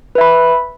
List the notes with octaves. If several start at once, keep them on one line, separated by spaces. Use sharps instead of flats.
B4 E5 B5